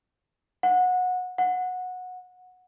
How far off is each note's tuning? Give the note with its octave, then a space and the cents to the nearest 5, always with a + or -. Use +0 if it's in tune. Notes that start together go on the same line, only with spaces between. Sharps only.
F#5 -20
F#5 -15